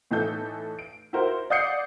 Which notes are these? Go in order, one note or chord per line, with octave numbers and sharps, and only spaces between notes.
A2 E3 D#4 A4 G6
D7
E4 F#4 A#4 C5
D5 F#5 D#6 G6 C7 C#7